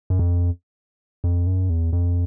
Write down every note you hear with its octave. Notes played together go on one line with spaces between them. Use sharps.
F#2
F2
F2
F#2
E2
F2